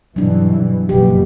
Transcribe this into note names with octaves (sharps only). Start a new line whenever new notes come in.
G2 B2 E3 F#3 D4
F#1 B2 F3 G4